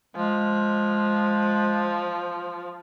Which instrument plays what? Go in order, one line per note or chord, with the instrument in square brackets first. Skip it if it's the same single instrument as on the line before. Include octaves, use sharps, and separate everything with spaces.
[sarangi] F3 [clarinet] G#3